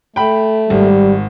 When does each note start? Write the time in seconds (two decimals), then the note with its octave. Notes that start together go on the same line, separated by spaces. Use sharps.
0.16 A3 G5 B5
0.70 G#1 G3